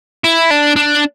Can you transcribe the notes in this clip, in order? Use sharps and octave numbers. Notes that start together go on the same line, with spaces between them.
E4
D4
D4